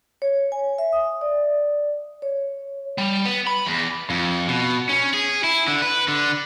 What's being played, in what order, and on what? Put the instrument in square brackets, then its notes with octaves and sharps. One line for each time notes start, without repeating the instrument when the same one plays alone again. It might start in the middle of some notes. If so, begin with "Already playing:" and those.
[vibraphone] C#5
G#5
E5
D#6
D5
C#5
[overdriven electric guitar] G3
B3
B5
E2
F2
B2
C#4
G#4
E4
D3
B4
D3